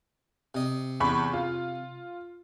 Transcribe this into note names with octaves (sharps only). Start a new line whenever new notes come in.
C3 D#5
E2 B5 C#6
F4